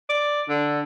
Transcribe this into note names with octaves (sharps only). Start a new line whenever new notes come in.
D5
D3